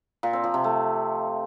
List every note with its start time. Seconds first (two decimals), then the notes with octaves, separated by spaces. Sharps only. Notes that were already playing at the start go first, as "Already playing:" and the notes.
0.23 A#2
0.33 C4
0.44 F3
0.54 C3
0.64 A3